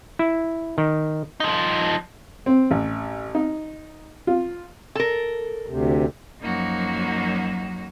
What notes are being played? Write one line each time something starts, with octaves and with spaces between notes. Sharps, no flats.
E4
D#3
F3 D#4
C4
A1
D#4
F4
A4 A#4
D2 C3
F#2 F3 F#3 A#3 D#4 F#4